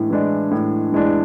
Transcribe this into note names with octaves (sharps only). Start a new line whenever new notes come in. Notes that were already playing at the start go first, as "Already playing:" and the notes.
Already playing: A2 E3 G#3 D4
E3 G#3 D4
A2
E3 G#3 D4